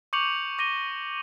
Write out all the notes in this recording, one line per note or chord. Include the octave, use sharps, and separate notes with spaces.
C#6 D6 G6 C#7 F7 F#7
D6 A#6 D#7 G7